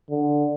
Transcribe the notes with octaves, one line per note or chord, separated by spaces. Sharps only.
D3